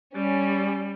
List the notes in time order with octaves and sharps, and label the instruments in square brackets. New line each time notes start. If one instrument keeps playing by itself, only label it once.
[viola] G3 [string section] C#4